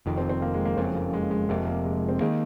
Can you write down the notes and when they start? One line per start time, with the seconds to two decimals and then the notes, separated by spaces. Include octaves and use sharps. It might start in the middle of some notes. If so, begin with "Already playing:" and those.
0.06 F1 F2 D#3
0.18 C4
0.30 C4
0.42 A#3
0.54 G#3
0.65 A#3
0.77 F#1 F2 C#3 C4
0.95 A#3
1.14 G#3
1.31 G#3
1.49 F1 F2 C3 A#3
1.67 A#3
1.85 G#3
1.97 G#3
2.09 C4
2.21 D#3 A#3 G#4